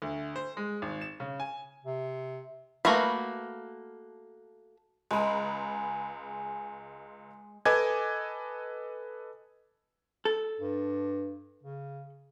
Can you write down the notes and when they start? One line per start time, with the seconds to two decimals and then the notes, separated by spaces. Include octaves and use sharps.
0.02 D2
0.36 C5
0.57 G#3
0.82 G#1
1.01 E7
1.20 C#3
1.40 G#5
1.85 C3
2.85 A3 A#3 F#4 B4 B5
5.11 C#2 G#3 A#5 B5
7.65 A4 B4 D#5 G#5 D6 G#6
10.25 A4
10.60 G2
11.63 C#3